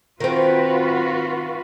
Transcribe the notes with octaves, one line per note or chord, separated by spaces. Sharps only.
D#3 C4 F4 F#4 B4